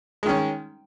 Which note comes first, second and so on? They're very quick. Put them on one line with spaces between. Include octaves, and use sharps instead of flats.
G#3 D#3 C#4